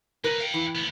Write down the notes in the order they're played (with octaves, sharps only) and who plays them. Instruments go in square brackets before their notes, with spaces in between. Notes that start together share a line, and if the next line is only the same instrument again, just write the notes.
[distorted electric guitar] C#2 B4 [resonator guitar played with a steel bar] A#4
[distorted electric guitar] F5 G5
[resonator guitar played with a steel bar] E3
[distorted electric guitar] D2 B3